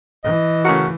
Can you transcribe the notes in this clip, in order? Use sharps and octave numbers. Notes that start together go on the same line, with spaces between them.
E3 D#5
C#3 A3 F#4 A#4